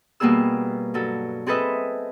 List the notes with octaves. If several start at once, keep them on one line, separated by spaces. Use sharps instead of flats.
B2 G3 A#3 B3 G#4 E6
G2 F#3 A4
C4 G#4 A4 B4 D#5 E5